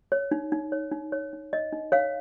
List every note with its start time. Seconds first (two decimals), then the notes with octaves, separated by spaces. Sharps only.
0.12 C#5
0.31 D#4
0.52 D#4
0.72 C#5
0.92 D#4
1.12 C#5
1.33 D#4
1.53 C#5 D#5
1.72 D#4
1.92 C#5 F5